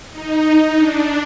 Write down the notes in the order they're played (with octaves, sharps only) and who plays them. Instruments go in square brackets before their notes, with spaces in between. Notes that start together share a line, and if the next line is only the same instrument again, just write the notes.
[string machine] D#4
D4